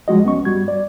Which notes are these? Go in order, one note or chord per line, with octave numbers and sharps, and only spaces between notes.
F3 G3 G#3 F#4 D#5
C2 B3 C#4 C#6
G2 G3 F#4 G#6
D5